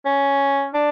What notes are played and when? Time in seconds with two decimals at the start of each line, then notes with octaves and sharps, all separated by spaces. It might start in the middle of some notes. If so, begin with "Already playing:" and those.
0.05 C#4
0.74 D4